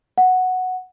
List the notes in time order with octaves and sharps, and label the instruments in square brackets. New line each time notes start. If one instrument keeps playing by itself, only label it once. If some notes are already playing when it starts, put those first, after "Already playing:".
[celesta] F#5